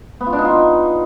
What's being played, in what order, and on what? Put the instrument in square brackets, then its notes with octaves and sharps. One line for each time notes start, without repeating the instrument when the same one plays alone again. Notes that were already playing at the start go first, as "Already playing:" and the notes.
[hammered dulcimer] B3
F4
D4
D#4
F4